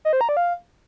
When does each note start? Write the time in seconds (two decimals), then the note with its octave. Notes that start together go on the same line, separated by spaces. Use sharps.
0.05 D#5
0.13 C5
0.21 A#5
0.29 D5
0.37 F5